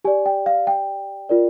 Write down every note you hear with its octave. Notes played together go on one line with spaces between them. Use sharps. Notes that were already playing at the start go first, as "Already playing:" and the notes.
G4 D5 G#5
G5
F5
G5
F4 A#4 D5